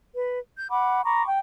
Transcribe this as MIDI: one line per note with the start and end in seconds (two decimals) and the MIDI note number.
0.14 0.39 71
0.55 0.67 91
0.70 1.02 78
0.70 1.02 83
0.70 1.02 86
1.04 1.26 82
1.04 1.26 83
1.04 1.26 85
1.04 1.26 86
1.27 1.39 79